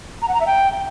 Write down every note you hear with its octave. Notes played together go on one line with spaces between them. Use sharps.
A#5
F#5
A#5
E5
G5